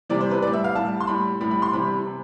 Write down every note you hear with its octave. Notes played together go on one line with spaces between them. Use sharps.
C3 E3 G3 D5
C5
B4
A2 G3 D5
E5
F5
A2 G3 A5
C6
A2 G3 B5
A2 G3 B5
B5
C6
C3 E3 G3 B5
C3